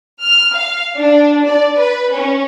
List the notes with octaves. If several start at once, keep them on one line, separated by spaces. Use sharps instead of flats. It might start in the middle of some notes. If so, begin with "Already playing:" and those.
F6
F5
D4
D5
B4
C#4